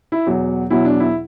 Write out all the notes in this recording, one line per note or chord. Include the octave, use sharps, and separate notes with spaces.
E4
E2 B2 F#3
E2 B2 F#3 E4
D4
E4